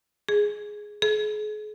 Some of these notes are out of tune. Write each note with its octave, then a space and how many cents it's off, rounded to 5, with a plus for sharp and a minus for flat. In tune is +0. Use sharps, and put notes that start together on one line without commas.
G#4 +5
G#4 +40